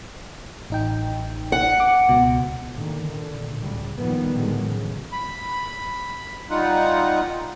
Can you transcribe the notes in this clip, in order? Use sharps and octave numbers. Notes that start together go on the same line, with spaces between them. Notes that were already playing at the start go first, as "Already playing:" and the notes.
A1 D#4 G5
F#5
D6
C#2 B2
A#2 D3 D#3
A#2 D3
C#2 A2 G3
A#2 D#3 F3 G3 B3
A2 D3 D#3 F#3 G#3
C#3
B5
G3 D#4 F4 F#5